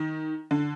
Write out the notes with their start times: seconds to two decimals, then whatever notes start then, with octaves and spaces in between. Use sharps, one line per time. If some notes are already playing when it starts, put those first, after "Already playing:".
Already playing: D#3
0.51 D3